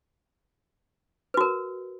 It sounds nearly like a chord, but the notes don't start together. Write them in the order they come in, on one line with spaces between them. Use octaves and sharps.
B4 F#4 A#4